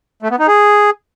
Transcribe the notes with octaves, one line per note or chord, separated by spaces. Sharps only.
A3
B3
D#4
G#4